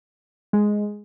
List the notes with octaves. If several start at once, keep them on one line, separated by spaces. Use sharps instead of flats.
G#3